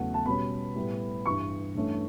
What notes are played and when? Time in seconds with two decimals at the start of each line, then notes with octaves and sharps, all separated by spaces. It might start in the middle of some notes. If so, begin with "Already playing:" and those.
Already playing: E2 C#3 F#3 A3 F#5
0.14 A5
0.26 B2 G3 C#4 B5
0.76 A2 G3 B3
1.26 G2 E3 G3 C#6
1.75 G2 E3 A3 C#4